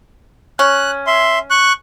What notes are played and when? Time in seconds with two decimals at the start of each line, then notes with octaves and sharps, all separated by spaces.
0.59 C#4 F#6
1.07 E5 C6
1.50 C#6 F#6